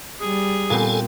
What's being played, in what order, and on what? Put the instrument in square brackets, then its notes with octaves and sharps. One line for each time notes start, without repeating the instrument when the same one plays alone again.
[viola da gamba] G3 [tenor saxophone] G#4
[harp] A#2 B3 C4 [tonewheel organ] A4 G#5